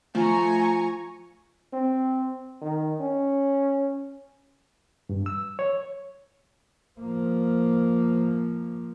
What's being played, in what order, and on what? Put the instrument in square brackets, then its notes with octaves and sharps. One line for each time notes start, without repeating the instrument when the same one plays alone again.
[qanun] F3 [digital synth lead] A3 [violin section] G#5 A#5 C#6
[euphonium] C4
D#3
C#4
[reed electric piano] G2
E6
C#5
[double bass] F3 A#3